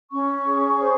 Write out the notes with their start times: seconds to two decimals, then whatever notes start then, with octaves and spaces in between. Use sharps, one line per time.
0.12 C#4 C#6
0.46 G#4
0.80 C5